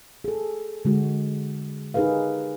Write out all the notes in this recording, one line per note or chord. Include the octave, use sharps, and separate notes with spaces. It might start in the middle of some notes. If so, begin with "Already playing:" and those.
G#4 A4
D3 G#3 F#4
D#4 G4 G#4 A#4 B4 F5